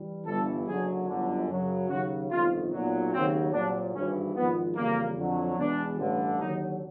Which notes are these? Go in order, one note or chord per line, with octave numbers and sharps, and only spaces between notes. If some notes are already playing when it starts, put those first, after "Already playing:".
Already playing: E3 G3
G1 G2 E3 A4
F#1 F#2 D3 F#3 G#4
G1 F#2 D3
F#2 C#3 F#3
D#2 C#3 F#3 F#4
G1 F2 C3 D#3 F4
B1 A#2 F#3
D#2 C#3 F#3 C4
C2 A#2 F#3 D4
G#1 G2 E3 C#4
G#1 G#2 F3 G#3 B3
F2 C#3 E3 G3 A#3
F2 D3 F#3
E2 B2 G#3 D4
A1 G2 D3
D#2 D3 F#3 D#4